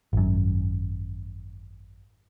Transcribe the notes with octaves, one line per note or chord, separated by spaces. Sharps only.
G#1 F#2